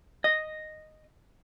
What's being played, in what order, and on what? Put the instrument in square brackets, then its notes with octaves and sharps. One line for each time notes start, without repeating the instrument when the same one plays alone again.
[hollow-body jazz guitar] D#5